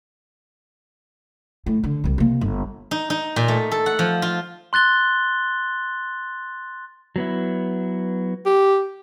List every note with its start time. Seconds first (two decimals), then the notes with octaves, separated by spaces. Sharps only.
1.66 A2
1.84 D3
2.04 C2 G3
2.18 C3 A#3
2.41 G1
2.91 D#4
3.10 D#4
3.36 A#2
3.48 A3
3.71 A4
3.86 F#5
3.99 F3
4.22 F4
4.73 C6 F#6 A6 G7
7.16 F#3 B3 E4
8.46 G4